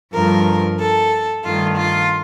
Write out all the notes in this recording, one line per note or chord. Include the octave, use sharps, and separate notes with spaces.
G2 F3 A3 A#4
A4
G2 D#3 A3 F4
F4